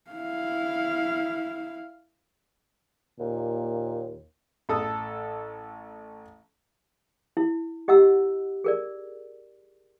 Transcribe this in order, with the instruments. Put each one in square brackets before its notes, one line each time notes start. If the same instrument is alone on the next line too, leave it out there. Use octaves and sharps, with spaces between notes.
[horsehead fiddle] E4 F5
[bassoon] D#2 [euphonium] A#2
[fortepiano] A1 A4 D#6
[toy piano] E4
G4 D#5 F#5 A#5 E6
G#4 A#4 D5